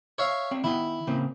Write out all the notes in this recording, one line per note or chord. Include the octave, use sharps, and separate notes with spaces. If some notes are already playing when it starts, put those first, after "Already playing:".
C#5 E5 F5
C4 D5
D#3 B3 E4 G5
C#3 A#3 C4